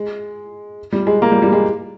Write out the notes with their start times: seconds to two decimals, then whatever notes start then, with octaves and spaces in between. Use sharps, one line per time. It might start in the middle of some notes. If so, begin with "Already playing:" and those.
Already playing: G#3
0.92 G3
1.07 G#3
1.22 A#3
1.32 G3
1.42 G3
1.53 G#3